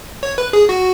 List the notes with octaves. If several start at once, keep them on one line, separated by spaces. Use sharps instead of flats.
C#5
B4
G#4
F#4